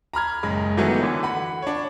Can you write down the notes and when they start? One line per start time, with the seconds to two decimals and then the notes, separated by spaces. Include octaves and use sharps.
0.14 A#5 B5 F6 G#6
0.43 F#1 G#3 B5
0.77 D#3 E3 F#3 A3 B3 E4
1.02 D3 E3
1.23 F#5 B5
1.62 D4 C#5